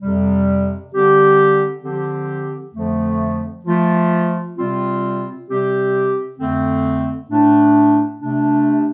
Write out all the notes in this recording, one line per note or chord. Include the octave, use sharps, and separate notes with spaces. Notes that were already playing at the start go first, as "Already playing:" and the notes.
F2 C3 G3
D3 G3 C4 G4
D3 F3 C4 G4
F2 D3 F3 A3
F3 A3 F4
C3 G3 C4 F4
C3 G3 C4 G4
F2 D3 A3 C4
A2 A3 D4
C3 A3 D4